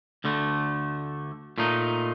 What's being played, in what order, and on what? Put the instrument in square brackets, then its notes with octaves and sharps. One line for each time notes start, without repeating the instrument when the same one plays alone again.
[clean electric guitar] D2 D3 A3
A#2 A3 D#4